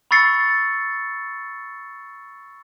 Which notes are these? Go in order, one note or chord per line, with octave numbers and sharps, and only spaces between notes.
B5 C#6 E6 A6 C7 C#7